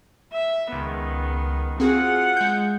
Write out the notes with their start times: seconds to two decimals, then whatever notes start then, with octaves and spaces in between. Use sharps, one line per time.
0.33 E5
0.73 C#2 D#3 B3
1.80 C4 F4 F#4 G#4 F#5
2.37 G#3 G6